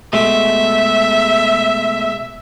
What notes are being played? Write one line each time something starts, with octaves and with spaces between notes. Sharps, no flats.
B2 G#3 A3 E5